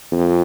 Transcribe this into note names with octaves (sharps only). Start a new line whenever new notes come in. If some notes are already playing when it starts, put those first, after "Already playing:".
F2